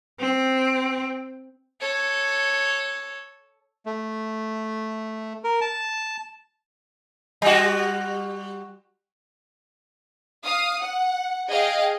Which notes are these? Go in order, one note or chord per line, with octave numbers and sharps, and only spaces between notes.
C4
A4 C#5
A3
A#4
A5
G3 F#4
F5 D#6
F#5
G#4 D#5 F5 G5